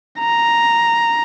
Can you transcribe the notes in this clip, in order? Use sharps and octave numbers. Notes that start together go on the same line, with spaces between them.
A#5